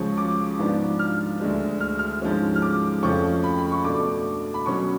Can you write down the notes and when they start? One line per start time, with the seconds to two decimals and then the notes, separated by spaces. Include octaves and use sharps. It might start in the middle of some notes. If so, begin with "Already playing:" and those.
Already playing: C#2 C#3 F3 C#6
0.17 D6
0.59 G#2 F3 B3 D4
0.99 F6
1.40 D2 D3 G#3 D4
1.80 F6
1.99 F6
2.22 G#2 F3 G#3 C#4
2.56 F6
2.62 D6
3.03 F2 C#3 F3 A3 C#4 C#6
3.44 B5
3.58 B5
3.72 C#6
3.85 B2 A3 D4 D6
4.54 B5
4.66 B2 F#3 C#4 C#6